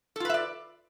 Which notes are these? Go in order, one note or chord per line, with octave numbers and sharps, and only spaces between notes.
F4 A4 B4 D5 E5